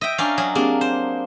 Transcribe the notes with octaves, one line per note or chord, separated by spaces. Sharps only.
D#5 E5 G5
C#4 D4 A#4 F5
F#3 G#4
A#3 C4 D4 G4 G#4
C5